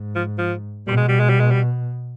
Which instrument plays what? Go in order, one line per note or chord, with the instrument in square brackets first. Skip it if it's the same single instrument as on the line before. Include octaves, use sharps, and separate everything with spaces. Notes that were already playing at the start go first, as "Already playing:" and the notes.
Already playing: [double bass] G#2
[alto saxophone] F3
F3
[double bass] B2 [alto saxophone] G3
[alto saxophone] G#3
G3
G#3
G3
G#3
G3